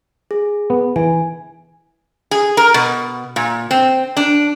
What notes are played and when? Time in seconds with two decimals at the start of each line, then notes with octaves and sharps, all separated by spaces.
0.31 G#4
0.70 B3
0.96 E3 G#5
2.31 G#4
2.57 A#4
2.74 B2
3.36 A#2
3.71 C4
4.17 D4